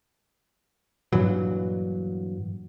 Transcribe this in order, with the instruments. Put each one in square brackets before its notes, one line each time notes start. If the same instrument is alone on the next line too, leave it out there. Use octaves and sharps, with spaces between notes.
[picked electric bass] G2 A#2 E3 F#3